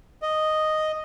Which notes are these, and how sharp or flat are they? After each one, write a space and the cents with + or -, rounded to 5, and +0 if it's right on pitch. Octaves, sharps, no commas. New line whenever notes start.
D#5 -5